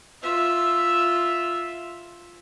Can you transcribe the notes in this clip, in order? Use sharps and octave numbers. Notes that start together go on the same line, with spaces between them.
F4 E5